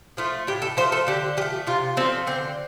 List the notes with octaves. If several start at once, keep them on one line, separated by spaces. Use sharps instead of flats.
F3 A3 F4
A2 G4
A4
F3 A3 C5
A4
D3 G4
F3 A3 G4
C3 F4
F3 A3 C4
D3 C4